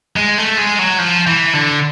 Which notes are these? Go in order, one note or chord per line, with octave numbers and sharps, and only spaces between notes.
G#3
A3
G#3
F#3
F3
E3
D3